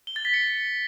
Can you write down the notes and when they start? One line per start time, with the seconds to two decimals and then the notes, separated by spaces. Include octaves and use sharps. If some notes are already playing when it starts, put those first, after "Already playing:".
0.07 G7
0.16 A6
0.25 B6
0.34 C#7